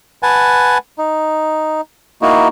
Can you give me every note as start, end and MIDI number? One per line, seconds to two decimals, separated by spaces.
0.23 0.78 71
0.23 0.78 78
0.23 0.78 80
0.23 0.78 81
0.98 1.81 63
2.22 2.48 58
2.22 2.48 63
2.22 2.48 64
2.22 2.48 66